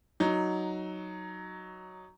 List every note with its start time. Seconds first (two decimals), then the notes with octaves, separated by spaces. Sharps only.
0.20 F#3 D#4